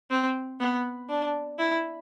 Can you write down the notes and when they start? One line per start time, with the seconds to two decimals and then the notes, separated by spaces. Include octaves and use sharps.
0.10 C4
0.60 B3
1.09 D4
1.58 E4